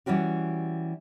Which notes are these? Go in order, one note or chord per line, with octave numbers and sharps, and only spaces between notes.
E3 G3 C#4 F#4 G4